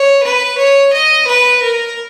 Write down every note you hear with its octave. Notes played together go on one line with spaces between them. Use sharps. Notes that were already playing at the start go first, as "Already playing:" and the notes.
Already playing: C#5
B4
C#5
D#5
B4
A#4